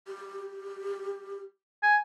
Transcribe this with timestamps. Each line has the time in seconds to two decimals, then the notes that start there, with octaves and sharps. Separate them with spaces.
0.07 G4
1.83 G#5